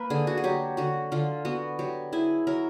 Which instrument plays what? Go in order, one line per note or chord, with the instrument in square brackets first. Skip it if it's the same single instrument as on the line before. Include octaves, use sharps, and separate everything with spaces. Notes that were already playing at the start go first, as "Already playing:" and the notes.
Already playing: [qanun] A#3 B4
D3 G#4
F#4
G#4
F#3 G4
D3 F#4
D3 F4
B3 F#4
F#3 G4
E4 G#4
F#3 A#4